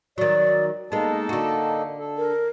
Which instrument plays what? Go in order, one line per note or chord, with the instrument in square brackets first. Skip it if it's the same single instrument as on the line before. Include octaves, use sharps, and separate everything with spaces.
[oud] D#3 F#3 [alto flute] D5
[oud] G#3 B3 [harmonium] A#3 D#4 A4 [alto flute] A5
[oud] D3 F#4
[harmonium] A4
[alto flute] A#4